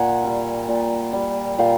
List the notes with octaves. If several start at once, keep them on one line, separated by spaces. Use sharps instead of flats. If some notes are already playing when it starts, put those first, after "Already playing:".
Already playing: A#2 F#5 G#5
G3
A#2
G3
A#2 F5 G5